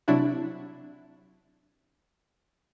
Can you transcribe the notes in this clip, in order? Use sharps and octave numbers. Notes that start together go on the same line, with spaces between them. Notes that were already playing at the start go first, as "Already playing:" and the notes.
C3 F#3 D4 E4 F#4